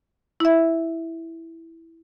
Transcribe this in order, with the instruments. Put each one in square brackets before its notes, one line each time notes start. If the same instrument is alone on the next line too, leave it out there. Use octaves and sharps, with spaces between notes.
[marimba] E4 E5